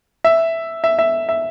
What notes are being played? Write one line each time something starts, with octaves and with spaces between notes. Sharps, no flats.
E5
E5
E5
E5